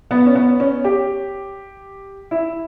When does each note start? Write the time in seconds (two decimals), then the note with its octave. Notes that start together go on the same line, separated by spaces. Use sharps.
0.11 B3
0.26 C#4
0.35 B3
0.60 C#4
0.84 G4
2.31 E4